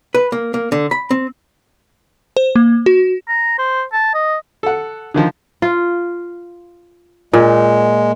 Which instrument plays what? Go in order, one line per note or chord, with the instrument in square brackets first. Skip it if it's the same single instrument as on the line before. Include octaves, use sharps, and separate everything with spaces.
[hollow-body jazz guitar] B4
A#3
A#3
D3
B5
C4
[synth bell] C5
A#3
F#4
[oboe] A#5
C5
A5
D#5
[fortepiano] A4 F#5
D3 D#3 F3
[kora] F4
[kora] A#2 [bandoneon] G#3